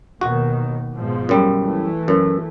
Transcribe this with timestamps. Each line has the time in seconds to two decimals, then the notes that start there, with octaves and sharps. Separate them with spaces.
0.21 D#2 B2 D#3 F#4
0.96 G#2 B2 F3
1.29 F#2 G3
1.59 E3 A3
2.08 F#2